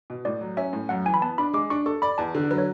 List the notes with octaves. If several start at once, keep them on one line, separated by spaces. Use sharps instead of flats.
B2
A2 D5
F#3
C#4 E5
A2
F#2 F#5
E3 G#5
B5
B3 A5
D4 B5
G#3 D6
D4 C#6
A4 C#6
D5 B5
E2 A5
D3
F#3 B4
C#5